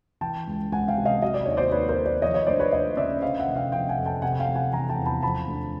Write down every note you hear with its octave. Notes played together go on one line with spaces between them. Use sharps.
E3 G5 A5
C#2
C#2 F#5 G#5
F5 G5
C3
D#5 F5
F#3 D#5
D5
D#2 C#5
C5 D5
D#2 B4 C#5
A#4 C5
D#3
C5 D5
F3 C#5 D#5
C#5 D#5
D2 C5 D5
B4 C#5
D2 C#5 D#5
C#3 D5 E5
D3 D#5 F5
E5 F#5
F1
F5 G5
F3 F5 G5
F#5 G#5
F2
G5 A5
C3 F#5 G#5
F#5
F5 G5
F1
F#5 G#5
E3 G#5 A#5
G5 A5
E2
A5 B5
F3 A5 B5
D2